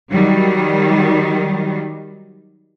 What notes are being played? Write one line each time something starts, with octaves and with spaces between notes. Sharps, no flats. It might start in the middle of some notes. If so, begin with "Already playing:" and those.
D#3 F#3 G3